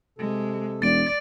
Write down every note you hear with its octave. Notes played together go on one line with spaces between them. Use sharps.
C3 G#3 A4
E1 D5 A6 D7